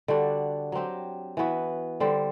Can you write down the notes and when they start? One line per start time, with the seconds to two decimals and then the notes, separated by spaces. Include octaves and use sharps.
0.08 D3 G3 D4 F#4
0.72 F#3 C4 G4
1.37 E3 B3 F#4
2.00 D3 G3 C4